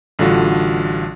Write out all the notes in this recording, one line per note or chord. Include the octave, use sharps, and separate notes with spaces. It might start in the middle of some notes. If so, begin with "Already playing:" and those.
A1 D3 G3 F4 F#4